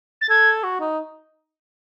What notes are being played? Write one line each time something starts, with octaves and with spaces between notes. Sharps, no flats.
A6
A4 G#6
F#4
D#4